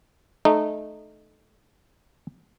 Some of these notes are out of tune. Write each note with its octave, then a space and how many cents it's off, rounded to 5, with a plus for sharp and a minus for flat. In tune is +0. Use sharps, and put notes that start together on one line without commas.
A3 -20 D#4 -25